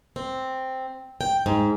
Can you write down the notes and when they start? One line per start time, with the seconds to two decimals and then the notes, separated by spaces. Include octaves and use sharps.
0.16 C4
1.21 G5
1.46 G#2